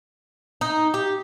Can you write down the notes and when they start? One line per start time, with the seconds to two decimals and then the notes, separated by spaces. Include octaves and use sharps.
0.61 D#4
0.94 G4